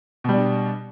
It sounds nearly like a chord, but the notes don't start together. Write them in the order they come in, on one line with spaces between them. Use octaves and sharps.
B2 G3 D4